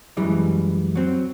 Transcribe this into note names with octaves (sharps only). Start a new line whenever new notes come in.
F#2 E3 G3 G#3
F#3 C4